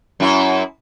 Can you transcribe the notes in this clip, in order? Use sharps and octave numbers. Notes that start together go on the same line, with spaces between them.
F#2 E4